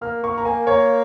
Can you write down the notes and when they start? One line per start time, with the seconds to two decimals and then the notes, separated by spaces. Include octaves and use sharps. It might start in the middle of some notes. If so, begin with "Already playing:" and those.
0.02 A#3 F6
0.23 A#3 C#6
0.38 A#5
0.45 A#3 G#5
0.67 A#3 C#5